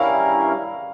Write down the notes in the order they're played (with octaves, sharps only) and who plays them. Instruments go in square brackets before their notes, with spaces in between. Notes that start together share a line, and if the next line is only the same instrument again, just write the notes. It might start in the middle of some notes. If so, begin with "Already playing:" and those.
Already playing: [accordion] G2 G3 C#4 E4 A#4 [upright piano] F5